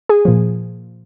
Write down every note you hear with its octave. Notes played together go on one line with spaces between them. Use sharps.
G#4
A#2 F3